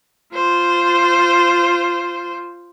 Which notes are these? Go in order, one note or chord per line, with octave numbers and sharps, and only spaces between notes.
F4 C5